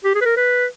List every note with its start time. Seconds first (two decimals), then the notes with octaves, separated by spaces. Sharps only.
0.04 G4
0.15 G#4
0.21 B4
0.25 A#4
0.36 B4